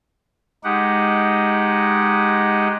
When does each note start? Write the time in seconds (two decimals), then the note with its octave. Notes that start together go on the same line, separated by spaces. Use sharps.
0.64 G#3 D#4 G4 F#5